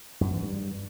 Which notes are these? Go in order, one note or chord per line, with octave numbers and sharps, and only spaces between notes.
F#2
E3
G2